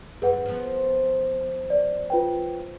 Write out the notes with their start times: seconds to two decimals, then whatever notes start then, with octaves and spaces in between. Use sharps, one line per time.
0.22 F#2 G#4 B4 F#5
0.46 F3 B3
1.70 D5
2.10 F4 B4 G5